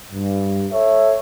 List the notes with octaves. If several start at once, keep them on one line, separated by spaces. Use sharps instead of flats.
G2
A4 C#5 E5